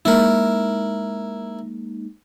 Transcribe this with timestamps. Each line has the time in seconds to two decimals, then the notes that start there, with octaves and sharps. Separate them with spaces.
0.05 G#3 A#3 D#4 E4 A#4